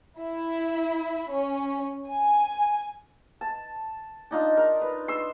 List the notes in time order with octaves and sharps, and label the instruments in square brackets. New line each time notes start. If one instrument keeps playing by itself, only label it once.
[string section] E4
C#4
G#5
[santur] A5
D4 D#4 F4
A#4
B4
C6 E6